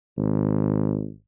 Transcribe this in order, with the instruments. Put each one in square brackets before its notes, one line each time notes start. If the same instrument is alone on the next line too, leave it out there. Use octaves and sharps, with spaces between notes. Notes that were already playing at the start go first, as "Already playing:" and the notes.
[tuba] G#1